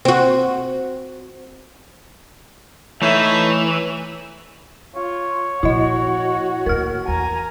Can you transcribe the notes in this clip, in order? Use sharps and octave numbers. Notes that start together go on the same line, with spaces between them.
C4 F#4
E3 A3 D#4 E4 A4 C#5 E5 G#5
F4 C#5
A#2 F3 E4 F#4 D#5
D#2 A2 A#4 F6
E2 G#5 A#5